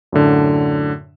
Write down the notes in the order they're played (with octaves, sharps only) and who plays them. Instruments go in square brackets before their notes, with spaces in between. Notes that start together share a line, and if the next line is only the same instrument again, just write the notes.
[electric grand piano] F#2 A2 D3